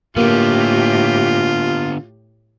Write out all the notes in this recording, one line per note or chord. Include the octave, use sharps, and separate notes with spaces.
A2 D3 A#3 B3 F4 G4